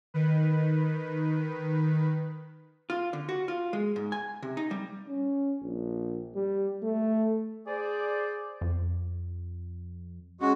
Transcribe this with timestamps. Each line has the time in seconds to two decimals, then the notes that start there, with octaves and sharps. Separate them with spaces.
0.14 D#3 B4
2.90 F4
3.13 D3
3.29 F#4
3.48 F4
3.73 G#3
3.96 G#2
4.12 G#5
4.43 C3
4.57 D#4
4.71 G3
5.08 C#4
5.62 A#1
6.35 G3
6.83 A3
7.66 G#4 C5 D5
8.61 F2
10.41 G#3 C#4 F#4